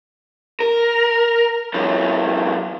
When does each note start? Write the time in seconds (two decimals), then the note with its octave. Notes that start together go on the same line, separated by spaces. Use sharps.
0.60 A#4
1.74 F#2 E3